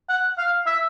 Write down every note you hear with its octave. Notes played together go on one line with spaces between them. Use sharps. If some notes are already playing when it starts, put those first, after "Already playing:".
F#5
F5
E5